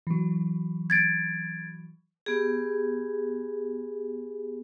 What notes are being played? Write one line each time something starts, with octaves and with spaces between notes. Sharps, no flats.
E3 F#3
G#6 A6 D7
B3 G4 G#4